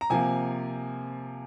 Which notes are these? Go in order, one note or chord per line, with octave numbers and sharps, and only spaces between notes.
A#5
C3 F3 A#3 G#5